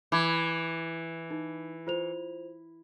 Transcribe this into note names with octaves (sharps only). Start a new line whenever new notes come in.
E3 B5 D6 G#6
D#4
F4 C5 F7